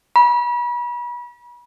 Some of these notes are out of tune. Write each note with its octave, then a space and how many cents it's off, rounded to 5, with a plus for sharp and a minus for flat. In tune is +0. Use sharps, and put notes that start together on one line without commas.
B5 -35